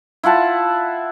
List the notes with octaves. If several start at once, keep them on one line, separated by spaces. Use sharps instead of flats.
E4 F4 F#5 A5